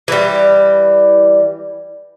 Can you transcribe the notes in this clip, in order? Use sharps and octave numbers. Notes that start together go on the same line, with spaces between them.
E3 G3